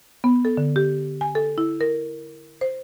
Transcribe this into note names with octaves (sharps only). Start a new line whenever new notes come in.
B3
A4
D3
G4
G#5
A4
E4
A#4
C5